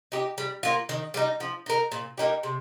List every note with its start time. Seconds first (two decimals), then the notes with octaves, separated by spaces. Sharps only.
0.12 D#4 G4
0.38 G3
0.63 A#3 F4
0.89 D#3
1.14 G3 D#4
1.40 F3
1.66 D#4 A#4
1.92 A#2
2.18 A#3 D#4 G4
2.43 C3